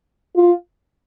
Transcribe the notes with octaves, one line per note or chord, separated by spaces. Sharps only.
F4